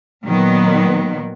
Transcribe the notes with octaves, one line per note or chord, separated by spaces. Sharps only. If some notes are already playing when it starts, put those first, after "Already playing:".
A#2 D#3 F#3 B3